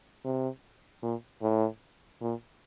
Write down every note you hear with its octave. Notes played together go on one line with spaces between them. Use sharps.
C3
A#2
A2
A#2